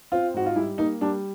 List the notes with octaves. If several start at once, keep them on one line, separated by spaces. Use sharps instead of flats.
C4 F4
G#2 F#4
F4
G3 E4
A#3 D#4
G3 D4